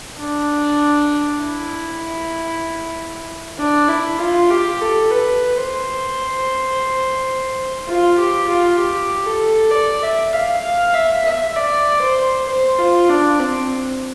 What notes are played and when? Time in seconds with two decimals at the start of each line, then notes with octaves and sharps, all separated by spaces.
0.20 D4
1.43 E4
3.58 D4
3.88 E4
4.19 F4
4.50 G4
4.80 A4
5.11 B4
5.57 C5
7.88 F4
8.18 G4
8.48 F4
8.79 G4
9.26 A4
9.71 D5
10.02 E5
10.33 F5
10.63 F5
10.94 E5
11.25 E5
11.56 D5
12.02 C5
12.48 C5
12.78 F4
13.10 D4
13.39 C4